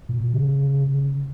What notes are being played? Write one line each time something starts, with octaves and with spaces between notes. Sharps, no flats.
A#2
C#3